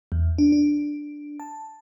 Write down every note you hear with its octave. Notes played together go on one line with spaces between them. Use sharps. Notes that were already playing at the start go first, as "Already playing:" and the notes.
E2
D4
D4
A5